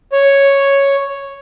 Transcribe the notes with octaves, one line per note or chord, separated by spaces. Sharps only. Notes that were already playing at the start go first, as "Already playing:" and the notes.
C#5